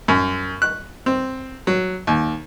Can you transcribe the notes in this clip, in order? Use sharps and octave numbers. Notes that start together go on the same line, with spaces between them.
F#2
F#6
C4
F#3
D#2